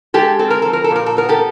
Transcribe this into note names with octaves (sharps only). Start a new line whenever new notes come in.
G#3 G4 A4
C4 A4
A#4
F3 A4
A#4
A4
A#2 A#4
A4
B3 A#4
G4 A4